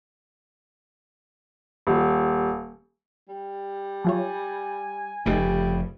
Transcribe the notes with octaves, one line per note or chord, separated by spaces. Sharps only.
D#1
G3
F#3 F4 C#5 G#5
F1 C#3 G3 A3 D#4